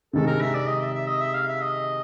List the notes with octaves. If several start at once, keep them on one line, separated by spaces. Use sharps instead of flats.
C3 D#3 G#3 A4
A#4
E5
D5
D#5
E5
E5
D#5
E5
F5
E5
D#5